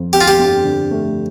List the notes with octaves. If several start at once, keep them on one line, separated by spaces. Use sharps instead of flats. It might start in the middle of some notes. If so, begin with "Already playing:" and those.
Already playing: F2
C4 G4
F4
G4
G2
D3
A3